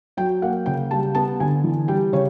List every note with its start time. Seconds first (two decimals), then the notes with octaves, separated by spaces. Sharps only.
0.17 F#3 G5
0.42 A#3 F#5
0.66 C#3 G5
0.91 G3 A5
1.15 B3 A5
1.40 D3 G#5
1.64 E3
1.88 G3 G5
2.13 C#3 C#5